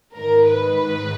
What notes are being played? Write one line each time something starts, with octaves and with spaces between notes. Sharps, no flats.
G#2 D#3 A#4
B4